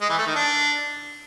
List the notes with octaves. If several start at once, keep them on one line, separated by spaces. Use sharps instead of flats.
G#3
E3
A3
D#3
D4